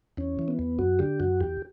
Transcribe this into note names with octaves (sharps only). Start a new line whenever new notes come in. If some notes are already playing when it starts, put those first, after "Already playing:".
E2 C#4
E3
B3
E2
F#2 F#4
D3 G4
F#2 F#4
E2 G4